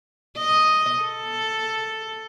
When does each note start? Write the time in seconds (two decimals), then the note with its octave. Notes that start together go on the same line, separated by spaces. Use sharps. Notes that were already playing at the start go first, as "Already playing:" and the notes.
0.39 D#5
1.02 A4